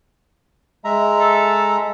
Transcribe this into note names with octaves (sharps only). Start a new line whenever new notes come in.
G#3 E5 A#5
A4